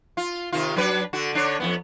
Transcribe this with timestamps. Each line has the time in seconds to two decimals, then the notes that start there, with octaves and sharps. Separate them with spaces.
0.17 F4
0.52 C3 D#3 F4
0.76 F#3 D4 B4
1.13 D3 F#4
1.33 D3 D4 C#5
1.60 F2 A#2 B3